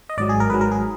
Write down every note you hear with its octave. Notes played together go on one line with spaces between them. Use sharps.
D#5
G#1 G#2 F#3 D5
G#4
A#4
G#1 G#2 F#3 B4
A#4
G#4